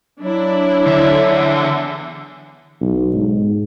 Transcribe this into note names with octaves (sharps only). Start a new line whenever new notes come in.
F#3 D4 E4
E2 D3 E5
B1
G#2